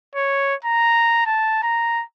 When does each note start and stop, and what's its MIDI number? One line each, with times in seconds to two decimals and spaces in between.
0.16 0.55 73
0.65 1.24 82
1.26 1.60 81
1.63 2.04 82